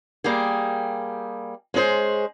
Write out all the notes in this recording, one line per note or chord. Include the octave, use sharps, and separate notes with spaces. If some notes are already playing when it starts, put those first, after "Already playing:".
G3 A#3 G4 G#4
G#3 C#4 G#4 C5